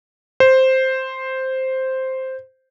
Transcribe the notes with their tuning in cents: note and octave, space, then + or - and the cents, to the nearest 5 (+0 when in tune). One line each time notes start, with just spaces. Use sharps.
C5 +0